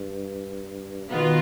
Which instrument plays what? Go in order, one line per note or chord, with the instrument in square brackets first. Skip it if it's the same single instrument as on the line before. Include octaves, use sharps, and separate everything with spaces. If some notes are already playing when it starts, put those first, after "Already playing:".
Already playing: [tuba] G2
[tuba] B2 [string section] D#3 B3 F4